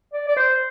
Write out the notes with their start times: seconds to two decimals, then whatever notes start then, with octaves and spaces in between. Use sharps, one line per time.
0.13 D5
0.28 D5
0.37 C5